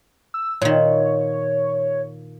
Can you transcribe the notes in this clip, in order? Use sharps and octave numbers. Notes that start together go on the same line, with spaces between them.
E6
A#2 D#3 C#5